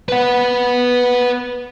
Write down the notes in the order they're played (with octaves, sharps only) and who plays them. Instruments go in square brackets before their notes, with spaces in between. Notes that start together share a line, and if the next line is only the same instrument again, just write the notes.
[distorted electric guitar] B4 F#5